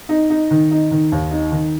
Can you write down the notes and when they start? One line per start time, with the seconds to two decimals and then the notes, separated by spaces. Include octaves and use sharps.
0.09 D#4
0.30 D#4
0.51 D#3
0.71 D#4
0.91 D#3
1.12 D#2
1.31 D#4
1.52 D#3